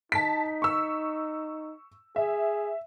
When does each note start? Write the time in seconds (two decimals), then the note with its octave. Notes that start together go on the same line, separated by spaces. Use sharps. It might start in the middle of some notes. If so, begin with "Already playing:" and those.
0.12 D#4 A5 B6
0.62 C#6 E6
2.16 G#4 E5